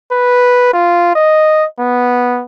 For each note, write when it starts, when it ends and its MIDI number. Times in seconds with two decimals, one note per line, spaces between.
0.12 0.69 71
0.74 1.15 65
1.15 1.66 75
1.80 2.44 59